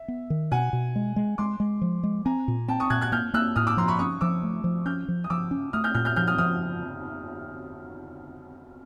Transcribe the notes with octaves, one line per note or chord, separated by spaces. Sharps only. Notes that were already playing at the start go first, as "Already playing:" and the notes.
Already playing: E5
B3
D#3
B2 F#5 G#5
B2
G#3
G#3
G#3 C6 D6
G#3
F3
G#3
C4 G#5 A#5
A#2
C4 G5 A5
C#6 D#6
A#2 F#6 G#6
F#6 G#6
A#3 F6 G6
A#3 E6 F#6
A2 D#6 F6
D6 E6
F3 A#5 C6
B5 C#6
C#4 C#6 D#6
F3 D6 E6
A3
F3
C#4 F6 G6
F3
D#6
F3 D6 E6
C#4
A3 D#6 F6
F6 G6
A#2 F6 G6
F6 G6
F3 F6 G6
D#6 F6
F3 D#6 F6